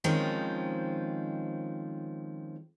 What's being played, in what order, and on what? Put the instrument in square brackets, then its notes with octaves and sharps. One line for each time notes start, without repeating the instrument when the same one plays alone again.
[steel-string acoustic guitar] D#3 F3 G#3 C4 C#4 F4